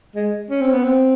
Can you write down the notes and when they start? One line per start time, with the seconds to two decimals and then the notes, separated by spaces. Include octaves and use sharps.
0.15 G#3
0.50 C#4
0.61 C4
0.72 B3
0.83 C4